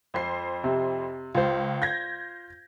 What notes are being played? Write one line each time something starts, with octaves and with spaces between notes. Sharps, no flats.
F2 C5 C7
C3
C#2 F4 C5
G6 G#6 A#6